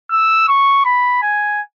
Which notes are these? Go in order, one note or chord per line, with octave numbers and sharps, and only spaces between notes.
E6
C#6
B5
G#5